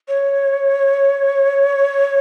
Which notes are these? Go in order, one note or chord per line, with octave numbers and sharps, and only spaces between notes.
C#5